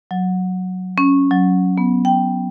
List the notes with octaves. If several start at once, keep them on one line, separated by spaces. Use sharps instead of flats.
F#3
C#4
F#3
B3
G5